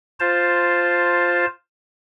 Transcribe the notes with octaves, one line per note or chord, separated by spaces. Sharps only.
F4 C5 A5